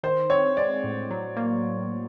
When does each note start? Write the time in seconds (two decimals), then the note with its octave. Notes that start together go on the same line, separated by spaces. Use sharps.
0.03 D#3 C5
0.30 C4 C#5
0.57 G#3 D5
0.84 A2
1.11 F#3
1.36 A#3